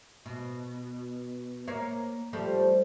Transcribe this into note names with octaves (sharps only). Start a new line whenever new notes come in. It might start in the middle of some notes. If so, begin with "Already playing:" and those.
B2
A#3 C#5 F5
F3 G3 A3